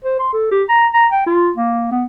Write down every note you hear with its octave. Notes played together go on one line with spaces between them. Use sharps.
C5
C6
A4
G4
A#5
A#5
G5
F4
A#3
B3